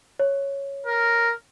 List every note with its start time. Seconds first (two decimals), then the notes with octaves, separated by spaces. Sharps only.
0.19 C#5
0.87 A#4